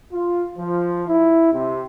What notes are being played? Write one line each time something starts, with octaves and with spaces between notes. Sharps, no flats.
F4
F3
E4
C3